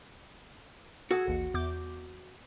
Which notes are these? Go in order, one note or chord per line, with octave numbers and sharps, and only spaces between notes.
F#4 G#4 A4 G#6
A1 D#2 C#7
E2 D6 G6